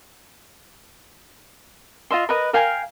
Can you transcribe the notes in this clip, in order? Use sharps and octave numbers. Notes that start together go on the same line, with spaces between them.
F4 D#5 E5 C6
A#4 B4 D#5
A#4 F5 G5 G#5